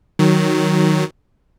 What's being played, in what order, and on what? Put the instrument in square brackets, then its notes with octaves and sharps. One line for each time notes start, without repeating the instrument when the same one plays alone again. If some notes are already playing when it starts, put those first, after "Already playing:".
[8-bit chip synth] D#3 F#3